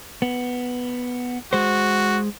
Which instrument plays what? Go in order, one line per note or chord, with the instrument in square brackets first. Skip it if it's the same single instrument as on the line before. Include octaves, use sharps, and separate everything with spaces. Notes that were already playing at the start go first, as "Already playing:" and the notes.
[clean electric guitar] B3
[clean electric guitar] G#3 C5 [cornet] F#4